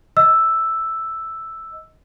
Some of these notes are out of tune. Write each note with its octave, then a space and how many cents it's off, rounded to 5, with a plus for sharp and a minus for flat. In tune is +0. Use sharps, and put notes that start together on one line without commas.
D#5 +15 E6 +0